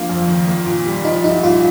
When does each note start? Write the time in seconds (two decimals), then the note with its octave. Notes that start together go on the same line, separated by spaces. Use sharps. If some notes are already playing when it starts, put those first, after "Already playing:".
Already playing: F3 A#3 D4
0.09 F2
0.28 D#3
0.48 A#3
0.66 A#2
0.86 G3
1.04 F3 D#4
1.24 C2 D#4
1.43 A#2 F4